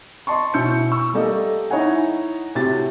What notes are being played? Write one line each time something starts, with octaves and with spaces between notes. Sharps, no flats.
D#5 A5 C6 C#6
B2 C#4 E4 E6 G6 C#7
C#6 E6
G3 A3 A#3 G4 A4 D#5
D#4 E4 C#5 D#5 F#5 G#5
A2 C3 F#4 A6